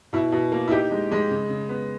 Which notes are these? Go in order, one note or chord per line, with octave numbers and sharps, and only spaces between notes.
B2 E4
B2
A#3
E4
D#4 G4
G#3
G#3
C#3
C#3
B3